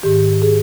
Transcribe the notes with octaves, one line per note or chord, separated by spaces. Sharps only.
G#2 D#3 G4
G#4